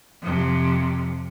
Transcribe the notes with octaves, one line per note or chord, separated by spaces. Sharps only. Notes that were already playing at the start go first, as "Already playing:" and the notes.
F2 C3